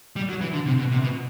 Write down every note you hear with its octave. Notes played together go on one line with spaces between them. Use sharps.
G3
F#3
E3
D3
C3
B2
C3
B2